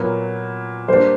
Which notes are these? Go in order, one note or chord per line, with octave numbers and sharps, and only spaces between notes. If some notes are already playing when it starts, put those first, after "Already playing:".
Already playing: A#2 F#3 B3 A#4
G3 A#3 D4 C5